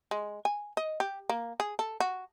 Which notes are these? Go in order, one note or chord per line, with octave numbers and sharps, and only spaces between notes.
G#3
G#5
D#5
G4
A#3
G#4
A4
F#4